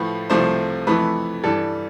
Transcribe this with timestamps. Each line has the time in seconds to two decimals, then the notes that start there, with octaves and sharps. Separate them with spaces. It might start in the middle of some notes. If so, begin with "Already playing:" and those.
Already playing: A2 F3 A3 B4
0.30 C2 C3 F3 A3 C5
0.87 F2 E3 A3 B4
1.43 G2 E3 G3 A4